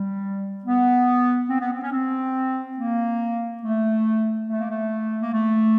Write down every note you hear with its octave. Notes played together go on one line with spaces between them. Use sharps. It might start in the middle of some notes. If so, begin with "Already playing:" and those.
Already playing: G3
B3
C4
B3
C4
C#4
C4
A#3
A3
A3
A#3
A3
A#3
A3